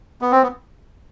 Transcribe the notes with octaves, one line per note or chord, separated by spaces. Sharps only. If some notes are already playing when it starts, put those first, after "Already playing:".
B3
C4
B3